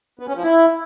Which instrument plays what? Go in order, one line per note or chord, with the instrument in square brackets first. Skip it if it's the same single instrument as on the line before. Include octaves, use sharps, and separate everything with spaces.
[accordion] B3
C#4
F3
E4